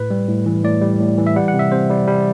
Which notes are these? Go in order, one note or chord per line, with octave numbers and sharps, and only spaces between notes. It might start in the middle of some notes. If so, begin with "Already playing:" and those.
Already playing: A2 B4
G3
A2
E3
A2 D5
G3
A2
E3
E5
G3 F#5
F#5
C3
E5
C3 C5
G3
G3